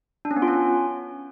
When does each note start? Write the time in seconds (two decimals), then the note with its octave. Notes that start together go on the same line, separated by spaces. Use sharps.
0.25 D4
0.31 C#4
0.36 B3
0.42 F4
0.48 C#4